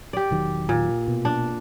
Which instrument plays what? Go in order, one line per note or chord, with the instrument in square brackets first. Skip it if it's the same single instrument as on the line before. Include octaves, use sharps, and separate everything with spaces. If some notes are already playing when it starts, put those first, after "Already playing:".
[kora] G4 D5
[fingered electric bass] E1 D#3 F#3
[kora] A#2
[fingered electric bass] B2
[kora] D4